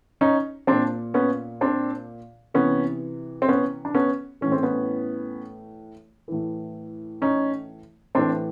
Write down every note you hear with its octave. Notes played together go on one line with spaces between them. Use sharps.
C#4 D#4
A#2 C4 D4
B3 C#4
C4 D4
C3 E3 B3 C#4
C4
B3 C#4
D4
B3 C#4
A2 E3 C#4
C4
B3 C#4
A2 E3
C#4 D#4
A2 E3 C4 D4